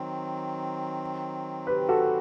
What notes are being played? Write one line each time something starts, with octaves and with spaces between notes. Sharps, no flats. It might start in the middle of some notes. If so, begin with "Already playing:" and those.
Already playing: D#3 F#3 C4
G4 B4
F#4 A4
A4